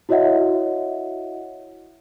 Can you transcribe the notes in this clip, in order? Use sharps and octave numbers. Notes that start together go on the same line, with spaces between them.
E4 F#4 C#5 D#5 E5 F#5